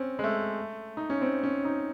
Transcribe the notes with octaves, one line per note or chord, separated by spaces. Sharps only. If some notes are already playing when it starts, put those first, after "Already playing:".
Already playing: C4 C#4
G#3
A3
D#4
C#4
C4
C#4
D#4